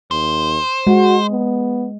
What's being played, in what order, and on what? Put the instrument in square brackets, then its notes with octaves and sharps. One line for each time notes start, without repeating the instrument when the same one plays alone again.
[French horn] D#2 [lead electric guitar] C5
[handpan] G#3 [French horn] F#4
[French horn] B3